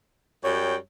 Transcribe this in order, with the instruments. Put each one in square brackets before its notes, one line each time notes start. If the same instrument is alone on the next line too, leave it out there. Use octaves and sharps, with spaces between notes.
[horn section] F#2 G3 G5 [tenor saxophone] C#5